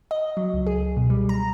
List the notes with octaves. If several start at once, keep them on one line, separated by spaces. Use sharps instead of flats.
D#5
F#3
C#2
G#4
B2
G3
A#5